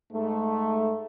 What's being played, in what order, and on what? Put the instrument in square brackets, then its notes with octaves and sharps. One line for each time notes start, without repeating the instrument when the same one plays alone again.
[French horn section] G#2 A3